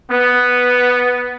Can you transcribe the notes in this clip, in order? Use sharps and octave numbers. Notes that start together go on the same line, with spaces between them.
B3